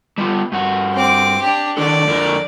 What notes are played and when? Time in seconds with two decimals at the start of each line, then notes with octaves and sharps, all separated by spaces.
0.18 G3 B3 F4
0.52 G2 F#4
0.94 C4 D6
1.42 D4 G4
1.77 D#3 D4 A4 D5
2.07 F2 D3 A#4